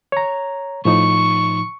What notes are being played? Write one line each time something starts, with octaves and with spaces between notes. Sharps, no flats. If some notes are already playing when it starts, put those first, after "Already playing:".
C#5 A#5
A2 F3 D#4 C#6